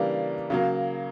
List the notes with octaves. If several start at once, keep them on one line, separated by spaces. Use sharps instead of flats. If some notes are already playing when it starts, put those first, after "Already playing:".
Already playing: C#3 E3 G3 A#3 D4
C#3 F#3 A#3